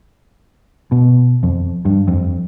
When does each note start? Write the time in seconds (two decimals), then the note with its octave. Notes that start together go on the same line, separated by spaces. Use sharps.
0.92 B2
1.43 F2
1.85 G2
2.08 F2